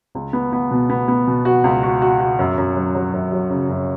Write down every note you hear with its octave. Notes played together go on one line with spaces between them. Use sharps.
C#2
B3
B3
B2
B3
B3
B2
F#4
C#2
F#4
F#4
F#4
F#2
F#2
F#3
F#3
F#2
F#3
C#3
F#2